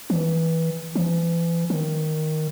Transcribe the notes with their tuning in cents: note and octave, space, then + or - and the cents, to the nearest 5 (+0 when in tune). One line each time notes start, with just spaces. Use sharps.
E3 -15
E3 +35
D#3 +0